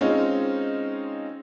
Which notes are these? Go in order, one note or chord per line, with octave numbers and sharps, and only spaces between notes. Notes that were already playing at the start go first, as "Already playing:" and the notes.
G#3 C4 C#4 D#4 F4